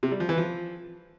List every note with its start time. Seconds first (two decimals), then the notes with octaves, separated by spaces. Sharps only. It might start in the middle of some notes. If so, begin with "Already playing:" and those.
0.03 C3
0.12 G3
0.20 F3
0.29 E3
0.38 F3